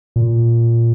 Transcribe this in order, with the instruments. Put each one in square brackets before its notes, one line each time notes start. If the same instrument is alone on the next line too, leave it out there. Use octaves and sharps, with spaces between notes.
[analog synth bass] A#2